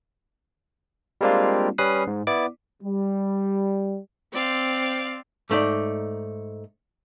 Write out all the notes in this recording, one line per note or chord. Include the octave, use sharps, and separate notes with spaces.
G3 G#3 A#3 C4 D4 F4
G3 C#4 B4 D#6 F#6 C7
G#2
B3 E4 D5 D6
G3
C4 D5 F5
G#2 A3 D#4 D5